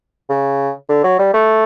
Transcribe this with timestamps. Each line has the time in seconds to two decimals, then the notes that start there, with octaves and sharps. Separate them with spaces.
0.29 C#3
0.89 D3
1.04 F#3
1.19 G3
1.33 A3